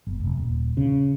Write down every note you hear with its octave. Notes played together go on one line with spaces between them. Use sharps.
G1
F1
D#1
C#3